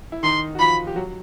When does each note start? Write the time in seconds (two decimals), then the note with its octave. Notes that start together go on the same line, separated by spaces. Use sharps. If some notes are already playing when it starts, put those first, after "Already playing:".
0.12 E4
0.23 D#3 D#4 C6
0.55 F#4
0.59 F3 F4 B5
0.87 G4
0.96 F#3 F#4